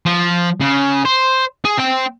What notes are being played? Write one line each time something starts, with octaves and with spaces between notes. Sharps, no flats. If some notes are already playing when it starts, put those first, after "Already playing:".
F3
C#3
C5
G#4
C4 G5